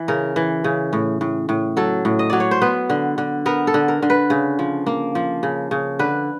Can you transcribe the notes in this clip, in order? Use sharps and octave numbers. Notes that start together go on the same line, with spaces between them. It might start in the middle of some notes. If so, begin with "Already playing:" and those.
Already playing: E3
C#3 A#4
E3
C#3
A2
A2
A2
F#3 A4
A2
D#5
F#3 D5
C#5
C5
B3 B4
D3
D3
B3 A#4
A4
D3
A#4
D3
B4
C#3
F3
A#3
F3
C#3
C#3
D3 B4